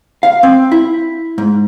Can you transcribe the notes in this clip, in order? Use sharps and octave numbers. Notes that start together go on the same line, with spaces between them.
F5
C4
E4
G#2